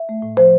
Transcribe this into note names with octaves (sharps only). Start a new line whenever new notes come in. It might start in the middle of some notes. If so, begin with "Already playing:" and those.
Already playing: E5
A3
A2
F3 C5